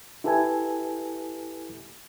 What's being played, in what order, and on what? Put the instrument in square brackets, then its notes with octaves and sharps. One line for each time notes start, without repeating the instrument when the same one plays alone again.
[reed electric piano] E4 G4 A4 B4 E5 G#5